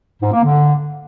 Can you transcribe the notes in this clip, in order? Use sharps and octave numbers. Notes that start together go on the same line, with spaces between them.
G#2
A#3
D3